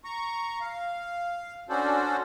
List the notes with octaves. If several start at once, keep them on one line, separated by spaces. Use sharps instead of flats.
A#5 C#6
F5
C#4 D4 F#4 A4 C5 D5